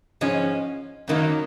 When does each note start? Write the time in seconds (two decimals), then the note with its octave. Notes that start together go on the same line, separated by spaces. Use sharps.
0.21 G#2 F3 G#3 C#4
1.08 F#2 D#3 F#3 A#3 D#4